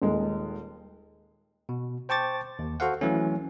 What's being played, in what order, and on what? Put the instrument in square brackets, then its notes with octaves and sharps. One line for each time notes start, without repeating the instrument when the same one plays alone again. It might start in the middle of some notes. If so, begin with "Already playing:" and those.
[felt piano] D#1 D#2 G#3
[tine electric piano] B2
C5 G5 A5 C#6 D6 A6
D#2
F#4 A4 C5 F5 F#5
E3 F#3 A3 C#4